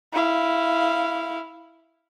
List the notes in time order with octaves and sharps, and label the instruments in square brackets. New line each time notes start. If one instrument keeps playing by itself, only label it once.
[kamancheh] E4 F5